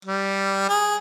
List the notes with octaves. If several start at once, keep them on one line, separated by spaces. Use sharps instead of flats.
G3
G#4